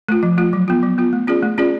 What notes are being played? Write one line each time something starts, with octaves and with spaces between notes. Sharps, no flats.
A3 F4
F3
A3 F4
F#3
B3 F4
F#3
B3 F4
A3
C#4 F4 G#4 D5
A3
C#4 F4 G#4 D5